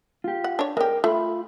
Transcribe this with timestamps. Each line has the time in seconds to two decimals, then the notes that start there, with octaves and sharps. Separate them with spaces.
0.24 F4 G4
0.44 F#5
0.59 D4 C#5
0.77 G#3 G4 A#4 G5
1.04 A3 F4 B5